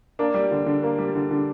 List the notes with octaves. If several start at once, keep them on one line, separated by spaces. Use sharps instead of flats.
A#3 D4
G3
D3
D3
A#3
G3
D3
D3